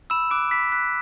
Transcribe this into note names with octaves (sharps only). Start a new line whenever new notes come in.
B5 E6 E7
D6 F#6 D7
B5 B6
F#6 B6